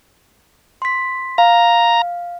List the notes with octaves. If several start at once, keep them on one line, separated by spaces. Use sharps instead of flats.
C6 B6
F5 A#5